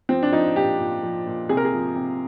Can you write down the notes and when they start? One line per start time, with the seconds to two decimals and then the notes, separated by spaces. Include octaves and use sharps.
0.09 F3 C4
0.23 D4
0.32 F3 D#4
0.56 A#2 G4
0.79 A#2
1.03 F3
1.27 A#2
1.49 C3 G#4
1.57 A#4
1.65 G#4
1.74 F3
1.96 C3